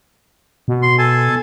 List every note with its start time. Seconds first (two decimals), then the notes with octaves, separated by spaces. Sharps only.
0.68 B2
0.82 C6
0.99 A4 G#5 A5